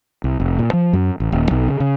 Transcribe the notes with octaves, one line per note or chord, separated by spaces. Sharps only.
C2
F1
A#2
F3
F#2
A1
D#1
B1
C#3
C#3